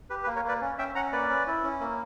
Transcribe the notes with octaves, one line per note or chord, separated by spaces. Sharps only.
G4 B4
B4
A#3
A#4 C#5
A#3 B4 D5
C#4
C#4 E5 G5
C#4 F#5 A#5
A#3 B4 D5
C#4
E4
C#4
A#3